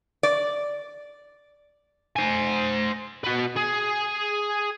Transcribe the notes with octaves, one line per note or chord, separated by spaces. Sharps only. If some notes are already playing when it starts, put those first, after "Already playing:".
D5
C5 G#5
F#4 B4
G#4